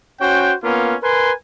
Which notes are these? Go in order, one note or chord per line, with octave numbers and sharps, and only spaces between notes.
C#4 F#4 C5 G5
A#3 B3 C#4 F4
A#4 B4 G#5 C6